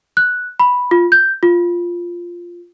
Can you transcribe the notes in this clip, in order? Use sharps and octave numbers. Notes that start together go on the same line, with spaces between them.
F#6
B5
F4
G6
F4